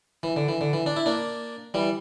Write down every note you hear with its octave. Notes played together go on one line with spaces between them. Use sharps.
E3
D3
E3
D3
E3
D4
E4
A#3 D4
E3 G3